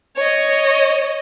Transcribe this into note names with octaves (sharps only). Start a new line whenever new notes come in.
C#5 D#5